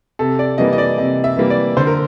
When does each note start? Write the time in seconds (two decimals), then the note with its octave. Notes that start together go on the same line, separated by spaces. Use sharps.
0.19 C3 A4
0.39 D5
0.58 E3 G3 A#3 D#5
0.73 D#5
0.78 D5
0.98 C3 D#5
1.24 E5
1.37 E3 G3 A#3
1.50 D5
1.77 D3 C5
1.87 A#4